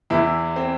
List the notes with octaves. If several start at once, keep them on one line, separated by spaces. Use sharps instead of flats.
E2 E3 E4
C4